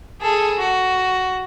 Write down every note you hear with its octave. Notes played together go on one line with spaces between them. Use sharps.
G#4 A4
F#4